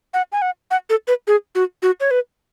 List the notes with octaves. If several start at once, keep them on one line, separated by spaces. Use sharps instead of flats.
F#5
G#5
F#5
F#5
A4
B4
G#4
F#4
F#4
C#5
B4